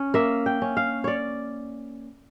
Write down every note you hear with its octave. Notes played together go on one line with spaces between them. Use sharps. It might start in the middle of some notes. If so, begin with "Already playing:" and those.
Already playing: C#4
A#3 E5
G5
C#4
F5
C#5 D5